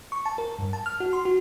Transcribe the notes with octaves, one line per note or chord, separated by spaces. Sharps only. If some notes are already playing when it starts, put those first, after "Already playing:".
C#6
A5
A#4
G2
A5
F6
F#4
C6
F#4